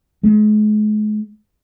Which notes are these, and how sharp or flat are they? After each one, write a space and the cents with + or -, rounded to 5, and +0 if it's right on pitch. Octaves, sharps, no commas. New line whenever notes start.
G#3 +40